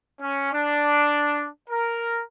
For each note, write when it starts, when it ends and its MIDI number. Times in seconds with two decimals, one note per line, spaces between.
0.21 0.49 61
0.52 1.47 62
1.70 2.21 70